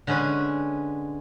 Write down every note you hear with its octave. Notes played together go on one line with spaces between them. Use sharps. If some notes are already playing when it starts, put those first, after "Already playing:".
D3 G#3 C#4 B4